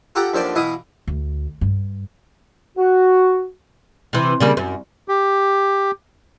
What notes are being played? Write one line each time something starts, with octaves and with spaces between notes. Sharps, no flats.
F4 G4 A4 F#5 A#5
D#2 D3 F3 C5 D5 C6
B2 E3 E4 F5 D#6
D2
G2
F#4
C3 E3
C#3 G3 A#3
F#2
G4